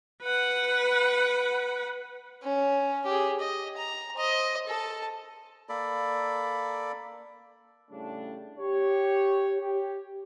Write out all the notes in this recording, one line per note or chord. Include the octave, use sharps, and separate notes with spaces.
B4 F#5
C#4
G4 G#4
D#5
A#5
C5 D#5
A4 A5
A#3 A4 D5 B5
A2 C#3 G3 A3 D4
G4 C#5
G4